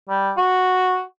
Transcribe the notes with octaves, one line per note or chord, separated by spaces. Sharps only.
G3
F#4